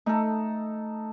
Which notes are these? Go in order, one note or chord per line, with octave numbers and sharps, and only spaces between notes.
A3 D#4 A4